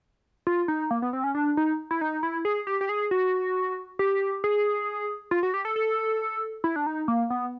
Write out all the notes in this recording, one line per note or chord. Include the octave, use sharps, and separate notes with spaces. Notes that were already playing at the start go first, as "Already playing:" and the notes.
F4
D#4
A#3
B3
C4
C#4
D4
D#4
E4
D#4
E4
G#4
G4
G4
G#4
F#4
G4
G#4
F4
F#4
G4
A4
A4
E4
D4
D#4
A#3
B3